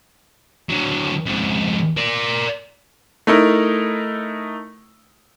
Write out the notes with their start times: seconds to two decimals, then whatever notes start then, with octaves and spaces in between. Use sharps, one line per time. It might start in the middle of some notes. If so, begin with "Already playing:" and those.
0.69 D3 F#3
1.26 F2 G#2
1.97 A#4 D5
3.27 A3 D#4 E4 A#4